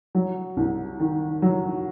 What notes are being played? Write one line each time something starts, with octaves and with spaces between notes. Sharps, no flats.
F#3
C2
D#3
F#3